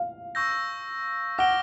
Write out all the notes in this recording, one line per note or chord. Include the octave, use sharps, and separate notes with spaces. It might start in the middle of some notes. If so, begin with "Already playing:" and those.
Already playing: F5
C#6 E6 G6 A#6
F#5 D6 F6 A#6 D7 G7